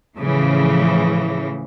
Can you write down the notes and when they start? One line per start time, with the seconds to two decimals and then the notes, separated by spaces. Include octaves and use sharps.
0.18 A2 C#3 E3 F3